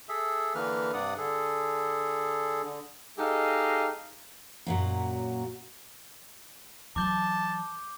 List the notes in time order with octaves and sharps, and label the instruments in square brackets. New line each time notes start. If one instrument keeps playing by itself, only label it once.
[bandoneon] G#4 A4 E5
D3 E3 A#3 B4 F6
G2 C3 D5 F#5 D#6
D3 G#4 A4
D3
[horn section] G#3 D#4 G4 A4 D#5 F5
[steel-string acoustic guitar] F#2 A#2 F#3
[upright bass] E3 F#3 [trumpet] A5 [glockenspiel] D6 G6 G7